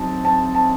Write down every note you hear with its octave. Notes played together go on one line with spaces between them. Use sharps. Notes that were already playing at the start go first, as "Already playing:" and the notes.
Already playing: F#3 C4 D#4 A5
C4 A5
C4 A5